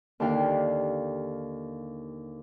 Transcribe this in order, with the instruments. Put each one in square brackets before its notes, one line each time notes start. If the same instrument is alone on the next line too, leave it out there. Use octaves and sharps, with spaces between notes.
[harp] D#2 D3 D4 G4 F5 G5